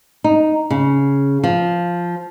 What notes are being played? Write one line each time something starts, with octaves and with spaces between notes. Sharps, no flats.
D#4
C#3
F3